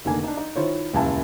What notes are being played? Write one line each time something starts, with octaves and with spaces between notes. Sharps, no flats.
F1 D3 D#3 A#3 G#5
D4 D#4
D#4
D#3 E4 F4 C5 C#5
D#1 C#2 F#2 E4 G#5 A5